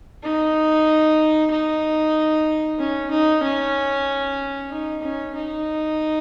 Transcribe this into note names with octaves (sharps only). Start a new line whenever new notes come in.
D#4
D#4
C#4
D#4
C#4
D#4
C#4
D#4